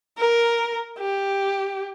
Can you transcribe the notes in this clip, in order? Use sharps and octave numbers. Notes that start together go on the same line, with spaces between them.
A#4
G4